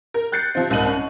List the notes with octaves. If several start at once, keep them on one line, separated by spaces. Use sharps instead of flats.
A#4
F#6 G6 A6 C7 C#7
C3 F3 C4
C2 G#2 A#3 D#7 F#7
C#4